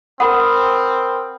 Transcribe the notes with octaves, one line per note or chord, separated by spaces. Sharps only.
C4 A#4 F#5 B5 D#6